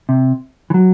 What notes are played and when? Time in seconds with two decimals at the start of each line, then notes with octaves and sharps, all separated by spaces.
0.09 C3
0.70 E3
0.74 F#3